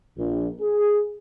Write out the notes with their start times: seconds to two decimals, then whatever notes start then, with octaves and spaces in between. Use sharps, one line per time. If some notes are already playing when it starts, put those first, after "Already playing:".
0.17 A#1
0.60 G#4